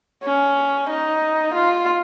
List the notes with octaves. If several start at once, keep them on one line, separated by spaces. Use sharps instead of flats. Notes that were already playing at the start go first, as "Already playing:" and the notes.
C#4
D#4
F4